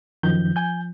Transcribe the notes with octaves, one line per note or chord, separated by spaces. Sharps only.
F#2 D#3 F3 G6
G#5 G6